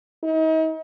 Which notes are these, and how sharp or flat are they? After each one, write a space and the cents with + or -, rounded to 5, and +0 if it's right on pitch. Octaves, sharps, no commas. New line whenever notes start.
D#4 +40